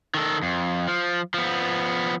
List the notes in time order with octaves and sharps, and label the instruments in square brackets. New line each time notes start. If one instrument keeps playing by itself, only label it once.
[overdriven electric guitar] D#3 A4
F2
F3
F3 B3